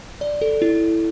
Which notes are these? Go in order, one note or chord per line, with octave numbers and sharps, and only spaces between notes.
D5
A4
E4